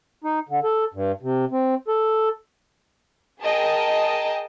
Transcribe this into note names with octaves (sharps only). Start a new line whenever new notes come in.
D#4
D3
A4
G2
C3
C4
A4
G#4 A#4 D#5 G5 A5